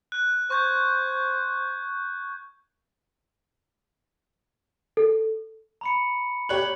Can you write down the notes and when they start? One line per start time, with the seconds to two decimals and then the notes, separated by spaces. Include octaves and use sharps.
0.12 F#6
0.50 C5 C#6 G6 G#6
4.97 A4
5.81 A#5 B5 C#7
6.49 G4 C#5 F#6 F#7